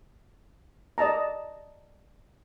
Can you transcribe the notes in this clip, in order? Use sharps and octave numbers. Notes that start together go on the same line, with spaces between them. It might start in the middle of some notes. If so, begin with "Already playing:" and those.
D5 D#5 A5 A#5